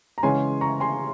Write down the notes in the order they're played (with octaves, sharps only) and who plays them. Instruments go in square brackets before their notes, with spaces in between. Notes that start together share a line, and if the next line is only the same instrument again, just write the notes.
[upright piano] A#5
C#3 E3 G#3 C#4 G#5 C6
A#5 C#6
G#5 C6